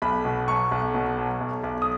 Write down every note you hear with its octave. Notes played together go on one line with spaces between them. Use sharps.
B1 B5
B2
F#3 C#6
B1
B2
F#3
B1
B1
D#6